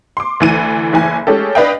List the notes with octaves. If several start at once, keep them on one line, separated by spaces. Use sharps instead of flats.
C6 D6
D2 E3 D#7
F#1 E3 G#5
G#3 A3 C#4 G4 A4
D4 B4 D#5 F5 G5